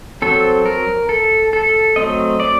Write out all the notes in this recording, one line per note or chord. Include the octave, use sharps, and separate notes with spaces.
F#3 C4 A4
A#4
A4
A4
F#3 A3 C4 D#5
D5